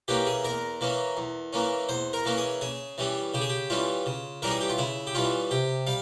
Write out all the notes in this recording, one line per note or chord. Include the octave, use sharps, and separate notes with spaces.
E3 A#3 C#4 G4
G#4
E2 A#4
E3 A#3 C#4
E2
E3 A#3 C#4
E2 C5
A#4
E3 A#3 C#4
G#4
C#3 G#4
E3 G3 C#4
C#3 G4
G#4
G4
E3 G3 C#4 F4
C#3
E3 G3 C#4 A#4
G#4
G4
F4
C#3 E4
G4
E3 G3 C#4 F4
C3 G4
G3 F5